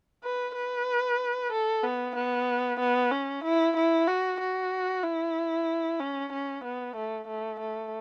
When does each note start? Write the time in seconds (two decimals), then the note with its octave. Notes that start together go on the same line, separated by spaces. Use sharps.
0.24 B4
0.55 B4
1.52 A4
1.83 B3
2.15 B3
2.80 B3
3.12 C#4
3.44 E4
3.76 E4
4.08 F#4
4.40 F#4
5.03 E4
6.00 C#4
6.32 C#4
6.64 B3
6.96 A3
7.28 A3
7.59 A3